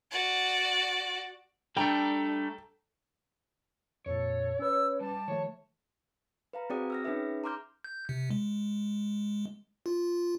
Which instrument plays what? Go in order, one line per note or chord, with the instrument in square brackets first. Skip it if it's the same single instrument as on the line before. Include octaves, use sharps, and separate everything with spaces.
[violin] F#4 D5
[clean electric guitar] G3 A3 [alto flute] D4 [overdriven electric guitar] A4 [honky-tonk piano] G5 A#5
[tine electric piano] F2 A#2 [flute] A4 [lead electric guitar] C#5
[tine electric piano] C#4 B4 [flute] E6
[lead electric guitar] G3 [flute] A5
[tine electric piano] D#3 F3 A3 [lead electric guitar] C#5
[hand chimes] B4 F5 A#5
C4 F#4 G#4 D5 G5 D#6
E6 F6 A#6
C#4 D#4 G#4 B4 E5
A#5 C6 D6 F6 G6
[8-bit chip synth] G6
C3
G#3
F4